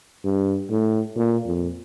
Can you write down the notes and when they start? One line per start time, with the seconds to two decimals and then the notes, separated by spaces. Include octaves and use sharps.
0.25 G2
0.70 A2
1.16 A#2
1.47 F2